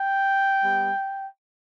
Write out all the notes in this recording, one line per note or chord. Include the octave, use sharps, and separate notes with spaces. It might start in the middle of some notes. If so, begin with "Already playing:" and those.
Already playing: G5
G3 B3